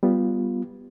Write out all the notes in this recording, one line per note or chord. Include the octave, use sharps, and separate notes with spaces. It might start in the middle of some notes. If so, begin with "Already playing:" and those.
G3 B3 F4